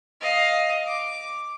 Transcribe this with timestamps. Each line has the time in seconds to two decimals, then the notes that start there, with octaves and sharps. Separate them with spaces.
0.22 D#5 F5
0.87 D6